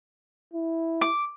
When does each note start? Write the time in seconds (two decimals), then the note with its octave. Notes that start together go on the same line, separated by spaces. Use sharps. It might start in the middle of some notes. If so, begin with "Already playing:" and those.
0.53 E4
1.01 D6